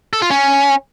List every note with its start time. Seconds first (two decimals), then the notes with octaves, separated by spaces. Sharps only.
0.13 A4
0.22 F4
0.31 C#4